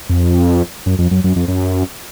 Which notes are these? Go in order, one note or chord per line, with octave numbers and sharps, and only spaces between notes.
F2
F#2
F2
F#2
F#2
F2
F#2